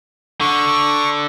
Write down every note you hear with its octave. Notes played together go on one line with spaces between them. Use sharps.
D3 C#6